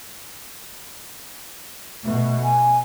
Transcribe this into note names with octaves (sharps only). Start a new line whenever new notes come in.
B2 A3
G#5